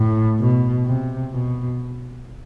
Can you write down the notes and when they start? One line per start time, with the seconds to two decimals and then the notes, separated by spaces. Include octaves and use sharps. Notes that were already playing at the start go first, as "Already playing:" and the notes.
Already playing: A2
0.40 B2
0.86 C3
1.33 B2